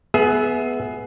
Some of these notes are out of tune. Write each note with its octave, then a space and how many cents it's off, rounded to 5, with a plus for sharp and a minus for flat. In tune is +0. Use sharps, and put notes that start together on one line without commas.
B3 +0 G#4 +20 E5 -10